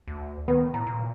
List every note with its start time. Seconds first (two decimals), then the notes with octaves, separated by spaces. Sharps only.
0.08 D2
0.48 D#3 B3
0.74 A2 A#5
0.87 A#2